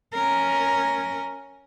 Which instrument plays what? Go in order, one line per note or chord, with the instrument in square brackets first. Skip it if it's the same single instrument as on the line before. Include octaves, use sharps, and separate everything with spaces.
[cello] C#4 A#4